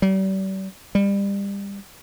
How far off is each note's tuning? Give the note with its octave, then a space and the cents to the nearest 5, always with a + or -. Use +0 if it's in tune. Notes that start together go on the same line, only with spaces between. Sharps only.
G3 -40
G3 +25